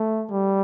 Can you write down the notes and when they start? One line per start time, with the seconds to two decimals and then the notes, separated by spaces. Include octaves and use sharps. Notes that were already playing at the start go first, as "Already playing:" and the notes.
Already playing: A3
0.30 G3